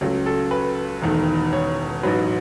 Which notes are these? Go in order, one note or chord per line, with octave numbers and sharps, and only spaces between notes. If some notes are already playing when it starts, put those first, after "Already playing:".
C#2 C#3 F#3 A3
A4
B4
E1 E2 D#3 A3
C#5
A1 G#2 F#3 B4